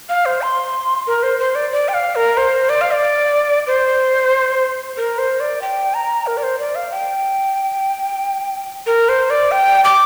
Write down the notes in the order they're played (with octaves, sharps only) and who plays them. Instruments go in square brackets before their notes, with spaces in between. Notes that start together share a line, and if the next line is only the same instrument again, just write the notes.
[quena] F5
C5
C6
A#4
C5
C5
D5
D5
G5
F5
A#4
C5
D5
F5
D5
C5
A#4
C5
D5
G5
A#5
A#4
D5
C5
D5
F5
G5
A#4
C5
D5
G5
D6